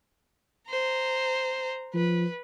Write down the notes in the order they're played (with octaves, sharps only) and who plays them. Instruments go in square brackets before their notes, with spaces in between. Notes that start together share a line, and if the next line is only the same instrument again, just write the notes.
[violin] C5 A#5
[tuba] F3 [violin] B4